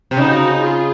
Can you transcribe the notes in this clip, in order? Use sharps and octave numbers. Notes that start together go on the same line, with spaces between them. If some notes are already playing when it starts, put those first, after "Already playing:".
C3
C#3 D#4 F#4
F4 G#4